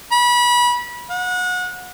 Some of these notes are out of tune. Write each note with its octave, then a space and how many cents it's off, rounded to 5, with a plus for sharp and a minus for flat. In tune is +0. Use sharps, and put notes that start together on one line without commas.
B5 -25
F#5 -30